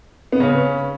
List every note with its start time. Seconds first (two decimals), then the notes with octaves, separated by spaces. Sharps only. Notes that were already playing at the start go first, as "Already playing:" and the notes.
0.32 B3
0.40 C#3 C#4